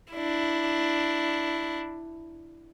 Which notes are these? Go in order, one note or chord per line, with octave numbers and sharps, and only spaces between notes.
D4 E4